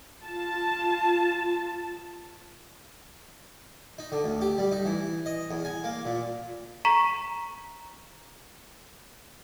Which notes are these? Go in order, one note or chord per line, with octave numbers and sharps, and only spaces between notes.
F4 A5
D#4
D3
D2
G4
G3
D#4
E3
D#5
E2
G#5
A#3
A#2
A#5 C#6 B6 E7